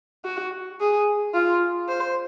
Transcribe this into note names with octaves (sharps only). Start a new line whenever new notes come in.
F#4
G#4
F4
C5